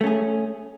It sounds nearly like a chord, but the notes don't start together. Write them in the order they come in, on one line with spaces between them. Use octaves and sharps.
A3 C#4 G#4